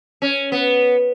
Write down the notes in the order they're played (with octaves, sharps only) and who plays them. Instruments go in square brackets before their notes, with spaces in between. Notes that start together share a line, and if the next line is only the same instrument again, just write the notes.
[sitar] C#4
B3